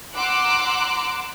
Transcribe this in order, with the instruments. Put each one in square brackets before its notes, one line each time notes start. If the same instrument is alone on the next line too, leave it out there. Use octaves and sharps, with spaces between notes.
[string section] F#5 A#5 C6 D6 E6 F#6